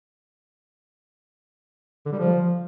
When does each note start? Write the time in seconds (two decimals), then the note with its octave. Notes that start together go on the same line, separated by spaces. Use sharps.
2.06 D3
2.12 G3
2.19 F3